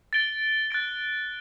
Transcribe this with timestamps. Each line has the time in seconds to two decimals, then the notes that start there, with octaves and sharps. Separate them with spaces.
0.13 A6 D7 G7
0.71 F#6 A6 D7